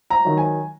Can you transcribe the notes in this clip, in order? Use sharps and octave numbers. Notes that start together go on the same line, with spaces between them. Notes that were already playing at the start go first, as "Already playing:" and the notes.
A#5
D#3 F#3
G#5